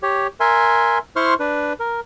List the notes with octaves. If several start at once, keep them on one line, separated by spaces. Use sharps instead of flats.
G4 C#5
A#4 E5 G#5 C6
E4 C5 C6 C#6 F6
D4 B4
A#4